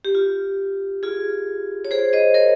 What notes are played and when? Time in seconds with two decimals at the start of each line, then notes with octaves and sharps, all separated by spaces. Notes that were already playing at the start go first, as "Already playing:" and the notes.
0.05 G4
0.15 F4
1.03 F4 G#4
1.85 C#5
1.91 G#4 C5
2.13 C5 D#5
2.34 A#4 C#5